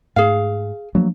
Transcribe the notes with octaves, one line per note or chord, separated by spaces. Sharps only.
G#2 A3 G#4 F5
F3 F#3 A3 A#3 D4